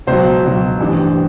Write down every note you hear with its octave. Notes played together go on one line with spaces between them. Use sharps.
C#2 B2 F#3 C5
C#2 B2 F#3
A1 G2 E3